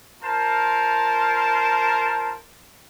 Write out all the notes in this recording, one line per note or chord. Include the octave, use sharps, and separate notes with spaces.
F4 A#4 C5 A5